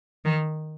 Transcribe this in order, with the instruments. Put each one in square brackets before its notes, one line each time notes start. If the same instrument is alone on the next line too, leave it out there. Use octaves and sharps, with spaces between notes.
[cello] D#3